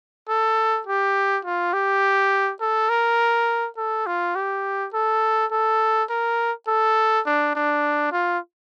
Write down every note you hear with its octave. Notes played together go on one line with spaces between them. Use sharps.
A4
G4
F4
G4
A4
A#4
A4
F4
G4
A4
A4
A#4
A4
D4
D4
F4